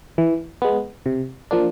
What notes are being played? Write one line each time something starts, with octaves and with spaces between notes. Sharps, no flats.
E3
G#3 B3
C3
F3 A#3 D4